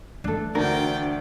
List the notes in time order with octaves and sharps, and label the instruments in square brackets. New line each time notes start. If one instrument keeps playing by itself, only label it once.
[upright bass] E3 A3 [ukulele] D4 A4
[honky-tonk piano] D2 [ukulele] A#4 [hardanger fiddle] D5 G5